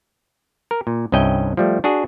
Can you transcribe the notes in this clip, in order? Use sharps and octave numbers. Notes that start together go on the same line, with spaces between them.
A#4
A#2
C2 G2 C#4 D#5 E5 G5
F3 G3 A3
D4 F#4 G#4